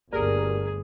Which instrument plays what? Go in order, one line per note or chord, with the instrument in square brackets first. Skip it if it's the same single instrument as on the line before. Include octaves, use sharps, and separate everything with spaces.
[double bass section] G1 D2 [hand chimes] A#3 G4 D5 [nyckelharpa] G#4 [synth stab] A#4